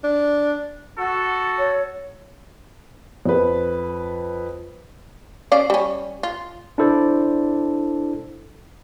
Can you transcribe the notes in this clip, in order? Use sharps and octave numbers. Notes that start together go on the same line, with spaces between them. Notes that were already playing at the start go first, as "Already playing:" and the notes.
D4
F#4 A4
C#5
F2 B4
C#4 D5 F5
G3 C#4
F4
D4 E4 A4 C5 D5